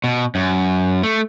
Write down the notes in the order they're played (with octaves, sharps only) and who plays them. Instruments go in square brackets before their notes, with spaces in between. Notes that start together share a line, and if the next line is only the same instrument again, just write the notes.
[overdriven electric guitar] B2
F#2
A3